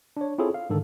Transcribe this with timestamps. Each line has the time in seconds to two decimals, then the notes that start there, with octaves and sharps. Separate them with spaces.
0.17 D4 C#5
0.38 C4 E4 F4 G#4 A4 C#5
0.54 F5
0.70 G#2 D3 D#3 A4